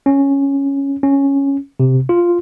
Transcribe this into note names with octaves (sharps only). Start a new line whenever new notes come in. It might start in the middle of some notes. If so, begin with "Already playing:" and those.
C#4
C#4
C3
F4